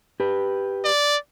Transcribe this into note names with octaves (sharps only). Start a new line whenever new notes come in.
G4 B4
D5